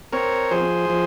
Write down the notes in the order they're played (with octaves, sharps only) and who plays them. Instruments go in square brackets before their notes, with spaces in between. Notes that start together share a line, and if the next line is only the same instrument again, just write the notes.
[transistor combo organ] C4 A#4 C#5
F3 G#4 C5
F3